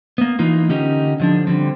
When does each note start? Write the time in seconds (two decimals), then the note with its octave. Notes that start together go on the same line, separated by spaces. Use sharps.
0.18 A#3 B3
0.39 E3 A#3 D#4 F4
0.69 D3 C#4 D#4 G4 A#4
1.20 D3 F3 D4
1.47 D3 G3 C4